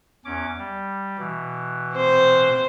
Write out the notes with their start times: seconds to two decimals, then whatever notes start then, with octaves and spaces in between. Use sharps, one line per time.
0.25 E2 C#4 D6
0.57 G3
1.18 B2 E3
1.95 C4 C5